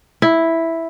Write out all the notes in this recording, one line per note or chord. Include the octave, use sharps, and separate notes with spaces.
E4